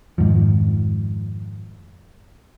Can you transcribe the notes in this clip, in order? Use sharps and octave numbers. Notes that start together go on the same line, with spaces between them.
F2 G#2 D#3 F3